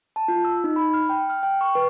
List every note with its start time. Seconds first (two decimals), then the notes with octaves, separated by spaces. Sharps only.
0.16 A5
0.28 F4
0.45 E6
0.64 D#4
0.76 B5
0.94 F6
1.09 G5
1.30 F6
1.43 G5
1.61 C#6
1.75 B4